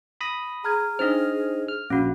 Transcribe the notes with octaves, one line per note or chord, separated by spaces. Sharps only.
B5 D#6 A#6
G#4 A#5 F6 G#6
D4 D#4 C5 D#5 F6
F6
A#1 C#4 F#4 F5